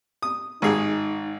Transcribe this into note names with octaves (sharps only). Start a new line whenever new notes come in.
D#6
G#1 D#4 G#4